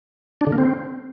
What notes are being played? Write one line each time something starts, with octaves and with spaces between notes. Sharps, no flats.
D4
D3
A#3
C4